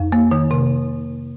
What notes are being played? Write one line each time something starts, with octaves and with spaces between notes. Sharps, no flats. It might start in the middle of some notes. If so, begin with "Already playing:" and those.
Already playing: F2 D#4
A#3
D#3
C3